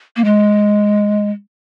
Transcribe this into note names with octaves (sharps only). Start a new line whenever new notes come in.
A#3
G#3